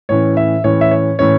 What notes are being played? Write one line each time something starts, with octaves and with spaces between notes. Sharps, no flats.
A2 E3 C#4 C#5
E5
A2 E3 C#4 C#5
E5
C#5
A2 E3 C#4 C#5